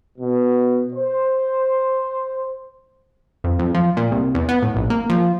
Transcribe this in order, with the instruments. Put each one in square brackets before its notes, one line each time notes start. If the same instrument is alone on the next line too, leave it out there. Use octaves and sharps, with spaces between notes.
[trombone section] B2
C5
[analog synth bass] F2
F2
F3
A#2
C2
E2
B3
A2
A#1
A#3
F3